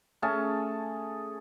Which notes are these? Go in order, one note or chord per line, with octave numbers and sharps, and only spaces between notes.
A3 C#4 G#4 A5